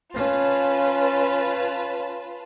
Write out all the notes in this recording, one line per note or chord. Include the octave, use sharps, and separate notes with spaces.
C#4 F4 B4 A5